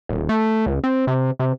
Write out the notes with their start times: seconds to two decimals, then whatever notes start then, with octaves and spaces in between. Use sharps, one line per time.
0.09 D#1
0.29 A3
0.66 C#2
0.84 C4
1.07 C3
1.39 C3